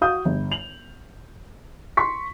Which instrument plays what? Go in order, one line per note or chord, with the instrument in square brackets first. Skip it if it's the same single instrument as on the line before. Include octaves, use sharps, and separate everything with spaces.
[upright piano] F#4 F5 D#6 G6
G1
F7 F#7
C6 C#6 B6